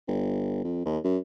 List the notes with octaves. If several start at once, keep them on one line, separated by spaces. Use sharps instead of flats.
G1
F2
D#2
F#2